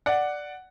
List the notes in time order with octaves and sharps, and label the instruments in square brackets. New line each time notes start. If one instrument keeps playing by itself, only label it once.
[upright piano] D5 F#5